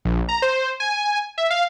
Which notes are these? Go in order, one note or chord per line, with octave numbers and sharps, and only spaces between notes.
A#1
A#5
C5
G#5
E5
F5